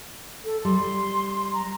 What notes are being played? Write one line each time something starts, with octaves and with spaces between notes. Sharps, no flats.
A4
G3 C6
A#5